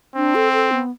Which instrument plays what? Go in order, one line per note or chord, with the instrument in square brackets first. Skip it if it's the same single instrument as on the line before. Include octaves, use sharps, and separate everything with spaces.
[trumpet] C4 [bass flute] D4
[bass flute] A4
A4
B3